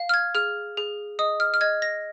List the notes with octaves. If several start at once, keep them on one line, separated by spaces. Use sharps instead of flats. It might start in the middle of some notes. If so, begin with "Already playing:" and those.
Already playing: F5
F6
G#6
G#4 F6
G#4
D#5 D#6
F6
F6
D#5 G#6
A#6